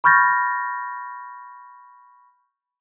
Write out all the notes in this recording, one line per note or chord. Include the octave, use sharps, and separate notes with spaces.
B5 C#6 F6 G6 A6 A#6